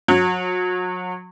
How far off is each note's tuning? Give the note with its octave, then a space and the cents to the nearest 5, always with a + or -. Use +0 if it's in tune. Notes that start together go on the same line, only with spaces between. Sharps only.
F#3 -30